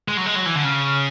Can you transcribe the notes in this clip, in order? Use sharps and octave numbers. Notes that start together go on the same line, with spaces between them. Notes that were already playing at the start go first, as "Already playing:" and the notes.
G#3
F#3
G#3
F#3
E3
D3
C#3